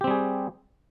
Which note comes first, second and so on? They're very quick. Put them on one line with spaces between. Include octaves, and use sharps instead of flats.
G4 C4 G3 G#4